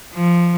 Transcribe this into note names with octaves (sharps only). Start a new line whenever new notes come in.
F3